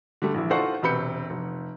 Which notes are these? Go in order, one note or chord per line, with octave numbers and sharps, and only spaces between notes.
D3 G3 A3
A#1 E3 E4
D#4 F4 A4 C5 F#5 C#6
E1 C3 B4 B5 G6 C#7
F1